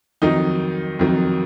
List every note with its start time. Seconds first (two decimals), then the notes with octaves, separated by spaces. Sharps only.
0.22 F2 D#3 F#3 D#4
0.99 F2 D#3 F#3